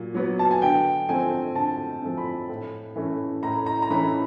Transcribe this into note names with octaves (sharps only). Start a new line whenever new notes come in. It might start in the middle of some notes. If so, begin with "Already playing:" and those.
Already playing: A#2 F#3
F#3 B3
A5
G#5
D3 G5
F3 A3 C4 G#5
D3 A5
F3 A3 C4
B5
A2
E3 A3 C#4
A2 A#5
A#5
A#5
E3 A3 C#4 B5